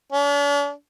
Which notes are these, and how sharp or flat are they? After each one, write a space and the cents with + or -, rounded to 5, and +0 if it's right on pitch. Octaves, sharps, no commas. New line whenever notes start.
D4 -45